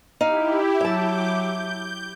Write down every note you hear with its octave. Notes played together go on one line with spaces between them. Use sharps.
D#4 E4 G4 F5
F#3 E5 A5 D6 G6
G6